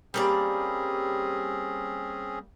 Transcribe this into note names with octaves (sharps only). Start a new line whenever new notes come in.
G3 A#3 C4 C#4 G#4 D5